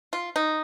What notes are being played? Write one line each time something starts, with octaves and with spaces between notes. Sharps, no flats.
F4
D#4